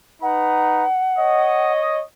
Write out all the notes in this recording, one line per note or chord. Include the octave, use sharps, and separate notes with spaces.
D#4 B4 F#5 A#5
C#5 D#5